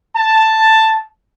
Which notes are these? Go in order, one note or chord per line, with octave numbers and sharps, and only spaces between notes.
A5